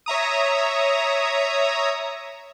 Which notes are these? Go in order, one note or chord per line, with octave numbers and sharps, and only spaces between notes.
C#5 E5 A#5 D#6